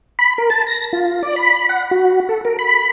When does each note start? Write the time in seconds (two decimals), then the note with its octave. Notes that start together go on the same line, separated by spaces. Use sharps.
0.19 B5
0.38 A#4
0.50 A5
0.67 A#6
0.93 F4
1.23 D5
1.36 B5
1.69 F#5
1.91 F#4
2.29 A4
2.45 A#4
2.59 B5